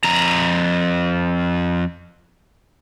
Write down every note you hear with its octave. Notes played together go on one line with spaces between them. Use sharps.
F2 A#5